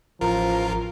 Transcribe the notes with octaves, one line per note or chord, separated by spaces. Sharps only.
A1 F3 F4 A#4 A#5